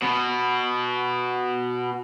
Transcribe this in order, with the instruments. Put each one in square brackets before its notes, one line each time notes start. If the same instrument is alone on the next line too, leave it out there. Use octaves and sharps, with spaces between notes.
[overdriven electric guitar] B2 B3